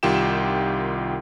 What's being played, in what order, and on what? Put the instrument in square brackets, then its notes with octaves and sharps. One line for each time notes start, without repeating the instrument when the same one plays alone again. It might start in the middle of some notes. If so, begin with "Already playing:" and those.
[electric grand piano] C2 D#3 F4 G4 G5 E7